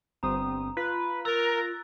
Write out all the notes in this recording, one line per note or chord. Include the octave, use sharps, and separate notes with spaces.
G1 C4 A#5 D#6
F4 B4
A#4 A#5 E6 F#6 A6